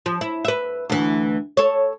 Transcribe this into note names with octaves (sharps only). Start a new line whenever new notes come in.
F3
E4
B4 E5
D2 E3
A4 C#5